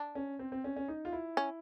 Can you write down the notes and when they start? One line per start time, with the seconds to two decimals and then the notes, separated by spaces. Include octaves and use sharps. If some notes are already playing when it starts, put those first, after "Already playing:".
Already playing: D4
0.15 C#4
0.39 C4
0.52 C4
0.64 C#4
0.76 C#4
0.88 D#4
1.05 F4
1.12 E4
1.37 C#4